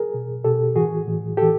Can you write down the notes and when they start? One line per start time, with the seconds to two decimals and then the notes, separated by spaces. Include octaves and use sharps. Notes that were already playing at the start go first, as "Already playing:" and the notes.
Already playing: G#4 A#4
0.14 B2
0.44 B2 G4 A4
0.76 A2 E3 F#4 G#4
1.07 A2 E3
1.37 A2 E3 G4 A4